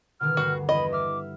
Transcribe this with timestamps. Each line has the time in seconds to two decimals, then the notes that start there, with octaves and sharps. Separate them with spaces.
0.21 B2 D3 D#3 F6
0.37 D2 G2 F#4 C7
0.69 E2 D#5 B5 D#7
0.92 E5 D6 F6